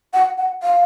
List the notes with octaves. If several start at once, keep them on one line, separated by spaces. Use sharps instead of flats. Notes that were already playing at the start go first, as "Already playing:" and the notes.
F#5
F#5
F5